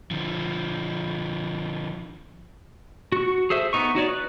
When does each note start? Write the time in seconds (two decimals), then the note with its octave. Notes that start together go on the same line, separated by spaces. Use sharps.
0.11 D3 F3
3.12 F#4 C#6
3.50 G#4 A4 C5 E5
3.73 B3 D#4 C#6
3.95 D#4 F#4 C#5 D5
4.09 B4